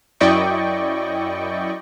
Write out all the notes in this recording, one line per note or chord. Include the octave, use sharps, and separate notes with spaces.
F#2 E4 D5 D#5 G5 C#6